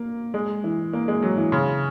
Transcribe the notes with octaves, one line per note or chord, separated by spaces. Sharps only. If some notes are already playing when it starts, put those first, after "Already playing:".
Already playing: A#3
G#3
E3
A#3
G#3
F#3
E3
C#3